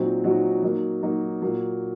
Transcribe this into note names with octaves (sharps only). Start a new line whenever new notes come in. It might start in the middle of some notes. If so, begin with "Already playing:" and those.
Already playing: A#2 F#3 C4 D#4 F#4
A#2 F#3 C4 D#4 F#4
F#3 A#3 D#4
F#3 A#3 D#4
A#2 F#3 A#3